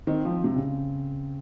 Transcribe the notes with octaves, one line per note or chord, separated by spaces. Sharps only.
D#3 C4
F3
C4
C3
C#3